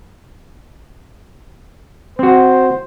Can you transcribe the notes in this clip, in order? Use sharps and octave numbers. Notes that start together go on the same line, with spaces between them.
C4 F#4 C5